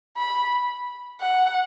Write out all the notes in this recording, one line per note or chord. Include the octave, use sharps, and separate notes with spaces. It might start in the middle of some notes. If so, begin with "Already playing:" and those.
B5
F#5